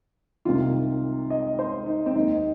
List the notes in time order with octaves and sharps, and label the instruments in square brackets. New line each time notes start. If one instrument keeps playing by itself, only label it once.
[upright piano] C2 C3 D#3 F4
D#5
C5
D#4
C4
D#2 D#3 D#4